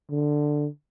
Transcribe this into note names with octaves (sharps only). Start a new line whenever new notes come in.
D3